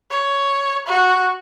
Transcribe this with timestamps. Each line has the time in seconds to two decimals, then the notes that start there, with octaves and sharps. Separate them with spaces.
0.11 C#5
0.87 F#4